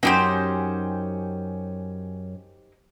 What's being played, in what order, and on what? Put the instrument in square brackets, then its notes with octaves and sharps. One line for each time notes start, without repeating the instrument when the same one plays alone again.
[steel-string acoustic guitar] F#2 C#4 [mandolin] D#4 G4 C5